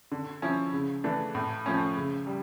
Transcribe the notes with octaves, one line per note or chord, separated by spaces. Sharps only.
D3
F3 C#4 E4
C#3
E3 A3 D4
A2
F3 A3 C#4
C#3
G3